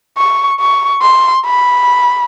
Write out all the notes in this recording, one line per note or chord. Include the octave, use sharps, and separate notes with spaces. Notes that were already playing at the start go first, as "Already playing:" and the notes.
C#6
C#6
C6
B5